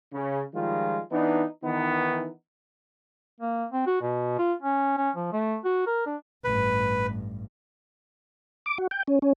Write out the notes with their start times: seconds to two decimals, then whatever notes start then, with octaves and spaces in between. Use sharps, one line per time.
0.13 C#3
0.54 D#3 F3 G3 G#3 F4
1.11 E3 B3 D4 D#4
1.64 D#3 E3 B3 D#4
3.40 A#3
3.71 C4
3.87 F#4
4.01 B2
4.39 F4
4.62 C#4
4.97 C#4
5.16 F3
5.33 A3
5.64 F#4
5.86 A#4
6.06 D4
6.44 A1 G2 B4
8.66 D6
8.78 F#4
8.91 G5
9.08 C#4
9.22 C#4